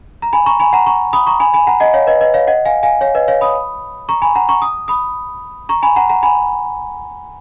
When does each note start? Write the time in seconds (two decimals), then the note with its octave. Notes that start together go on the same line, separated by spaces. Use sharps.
0.22 A#5
0.33 G#5 B5
0.46 A#5 C#6
0.60 G#5 B5
0.73 F#5 A#5
0.86 A#5 C#6
1.13 B5 D#6
1.27 A#5 C#6
1.40 G#5 B5
1.54 G#5 B5
1.67 F#5 A#5
1.80 D#5 F#5
1.94 C#5 F5
2.07 B4 D#5
2.21 B4 D#5
2.34 C#5 F5
2.47 D#5 F#5
2.65 F5 G#5
2.83 F5 G#5
3.01 C#5 F5
3.15 B4 D#5
3.28 C#5 F5
3.41 B5 D#6
4.09 A#5 C#6
4.22 G#5 B5
4.35 F#5 A#5
4.49 A#5 C#6
4.62 D#6
4.88 B5 D#6
5.69 A#5 C#6
5.83 G#5 B5
5.96 F#5 A#5
6.09 F#5 A#5
6.23 G#5 B5